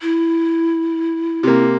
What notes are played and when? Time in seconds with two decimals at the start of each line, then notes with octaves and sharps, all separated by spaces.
0.01 E4
1.43 C3 A#3